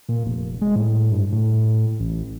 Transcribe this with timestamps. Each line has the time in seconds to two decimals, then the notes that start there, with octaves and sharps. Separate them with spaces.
0.09 A#2
0.26 F1
0.61 G#3
0.76 A2
1.12 G2
1.33 A2
2.00 A1